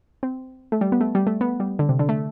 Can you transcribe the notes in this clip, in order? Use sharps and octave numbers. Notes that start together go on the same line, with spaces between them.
C4
A3
G3
B3
A3
G3
A3
B3
G3
D3
C3
D3
A3